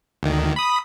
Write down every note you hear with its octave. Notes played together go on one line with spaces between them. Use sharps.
D2 D#3
B5 D#6